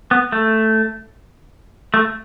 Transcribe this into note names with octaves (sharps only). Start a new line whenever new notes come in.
B3
A3
A3